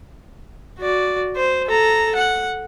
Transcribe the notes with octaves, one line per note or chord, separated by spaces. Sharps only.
F#4 D5
C5
A4 A#5
F#5